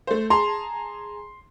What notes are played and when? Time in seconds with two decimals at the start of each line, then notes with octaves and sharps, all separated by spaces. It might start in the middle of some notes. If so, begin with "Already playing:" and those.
0.07 A3 C5
0.30 G#4 A5 A#5 C6